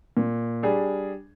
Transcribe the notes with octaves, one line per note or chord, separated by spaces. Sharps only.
A#2
G3 D4 G#4